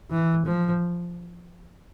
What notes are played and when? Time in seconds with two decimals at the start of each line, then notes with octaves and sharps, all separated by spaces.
0.10 E3
0.46 F3